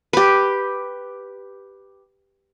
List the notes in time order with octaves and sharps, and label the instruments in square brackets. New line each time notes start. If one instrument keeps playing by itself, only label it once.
[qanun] G4 B4